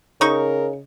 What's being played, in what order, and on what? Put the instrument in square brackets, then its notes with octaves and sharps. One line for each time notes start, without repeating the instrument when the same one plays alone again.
[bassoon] C#3 [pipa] D#4 C#6 [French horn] A#4